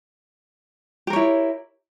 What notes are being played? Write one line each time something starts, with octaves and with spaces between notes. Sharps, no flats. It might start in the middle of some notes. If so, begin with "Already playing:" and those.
E4 G4 A#4 C#5